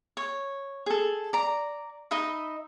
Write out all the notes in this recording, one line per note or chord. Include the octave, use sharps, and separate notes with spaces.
C#5
G#4 A4
D5 A#5
D#4 D#5 E5 B5